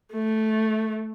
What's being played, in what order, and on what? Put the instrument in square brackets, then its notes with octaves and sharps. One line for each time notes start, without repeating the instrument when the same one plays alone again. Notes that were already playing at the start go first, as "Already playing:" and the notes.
[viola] A3